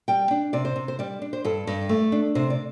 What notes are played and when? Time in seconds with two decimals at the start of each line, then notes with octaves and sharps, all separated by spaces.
0.08 G3 G5
0.31 D4
0.53 C3 D5
0.65 C5
0.76 C3
0.88 C5
0.99 G3 D5
1.22 D4
1.33 C5
1.45 G2 A4
1.67 G2
1.89 A3
2.12 D4
2.35 C3 C5
2.50 D5